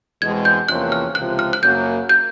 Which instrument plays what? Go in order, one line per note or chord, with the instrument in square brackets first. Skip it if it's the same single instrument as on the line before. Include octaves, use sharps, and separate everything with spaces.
[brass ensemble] E2 B2 G#3 C4 [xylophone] G#6
[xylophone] G6
[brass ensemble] E2 C3 F3 A#3 C#4 [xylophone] F#6
[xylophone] F6
[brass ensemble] C#2 C3 F3 [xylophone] F#6
[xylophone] F6
F#6
[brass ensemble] F#2 C#3 F#3 A#3 [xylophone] G6
[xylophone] G6